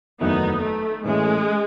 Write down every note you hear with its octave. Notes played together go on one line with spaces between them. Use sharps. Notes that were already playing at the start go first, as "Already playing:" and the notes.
F#1 E2 D#3 F#3 A3 B3 D#4
A3
A2 E3 G#3 A3 C#4